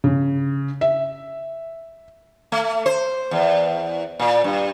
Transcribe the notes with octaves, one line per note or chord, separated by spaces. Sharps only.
C#3
E5
A3
C5
E2
A#2
G2